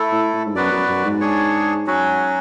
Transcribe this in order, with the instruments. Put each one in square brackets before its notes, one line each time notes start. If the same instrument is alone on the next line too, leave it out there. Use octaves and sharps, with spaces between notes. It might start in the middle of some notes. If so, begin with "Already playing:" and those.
Already playing: [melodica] A3 E4 A4
[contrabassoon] A2
A2
G#2
[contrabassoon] F#2 [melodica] B3 F#4 B4 D5
[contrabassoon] F#2
F#2
G#2
[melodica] D4 G#4 C#5
F#3 C#4 F#4